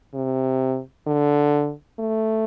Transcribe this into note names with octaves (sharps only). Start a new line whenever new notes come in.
C3
D3
A3